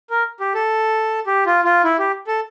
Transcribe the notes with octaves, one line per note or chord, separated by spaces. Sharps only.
A#4
G4
A4
G4
F4
F4
E4
G4
A4